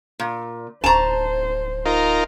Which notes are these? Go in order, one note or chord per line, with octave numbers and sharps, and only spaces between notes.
A#2
D1 F3 C5 A5 A#5
D#4 F4 A#4